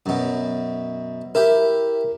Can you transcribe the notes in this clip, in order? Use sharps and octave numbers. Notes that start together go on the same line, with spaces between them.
F#2 B2
E4 G4 A#4